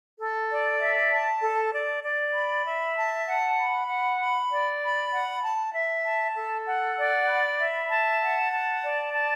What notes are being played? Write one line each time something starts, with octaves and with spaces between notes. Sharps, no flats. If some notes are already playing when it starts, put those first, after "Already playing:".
A4
D5
E5
A5
A4
D5
D5
B5
E5
A5
F#5
B5
F#5
B5
D5
B5
F#5
A5
E5
A5
A4
F#5
D5
B5
E5
A5
F#5
A5
D5
A5